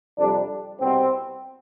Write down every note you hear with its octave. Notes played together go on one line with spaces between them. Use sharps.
F2 C3 G3 D4
C2 B2 B3 C4